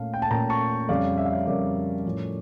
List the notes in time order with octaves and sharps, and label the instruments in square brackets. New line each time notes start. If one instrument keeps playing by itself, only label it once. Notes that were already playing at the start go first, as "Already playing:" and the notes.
Already playing: [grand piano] A#2 A3 C#4 F5 A5
G5
A5
A#2 A3 C#4 G5 A#5
A5 C#6
F2 C#3 G3 C#4 D5 F5
E5
F5
C#5 E5
F2 C#3 G3 C#4 A#4 D5
A2 F3 C#4